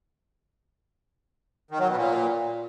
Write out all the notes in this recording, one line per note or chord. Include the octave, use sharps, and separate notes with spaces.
D#3
F#3
B2
A#2